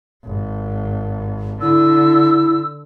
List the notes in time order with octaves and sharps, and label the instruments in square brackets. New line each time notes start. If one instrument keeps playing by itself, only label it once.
[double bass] G#1
[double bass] D3 [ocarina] E4 [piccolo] E6